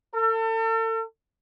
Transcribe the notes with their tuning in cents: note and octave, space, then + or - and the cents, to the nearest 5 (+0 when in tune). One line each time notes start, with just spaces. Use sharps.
A4 +40